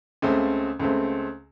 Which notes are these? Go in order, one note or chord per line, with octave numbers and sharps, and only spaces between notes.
C#2 C#3 A3 C4
C#2 C#3 A3 C4